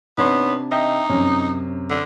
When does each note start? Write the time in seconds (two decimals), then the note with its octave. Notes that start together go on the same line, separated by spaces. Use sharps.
0.18 C3 B3 D4 D#4 C#5 C6
0.72 D#4 D#5 E5 G5
1.10 F#2 C3 C#4
1.90 D3